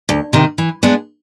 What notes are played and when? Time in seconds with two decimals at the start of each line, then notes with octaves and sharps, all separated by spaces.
0.09 D2
0.33 C3 D#3
0.58 E3
0.83 G#3 B3 D4